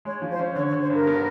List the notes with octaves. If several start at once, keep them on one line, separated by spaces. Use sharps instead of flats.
G#3 C#5
F3
C5
C#4
D3 C#5
C#5
D3
C5
G2 A#4
B3